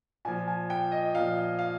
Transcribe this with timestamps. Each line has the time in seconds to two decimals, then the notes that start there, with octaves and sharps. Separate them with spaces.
0.25 A#2 F3 G#5
0.48 G#5
0.70 G5
0.92 D#5
1.14 A#2 F3 F5
1.59 F5